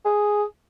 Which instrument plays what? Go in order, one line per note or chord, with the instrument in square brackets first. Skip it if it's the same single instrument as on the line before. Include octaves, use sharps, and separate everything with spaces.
[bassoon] G#4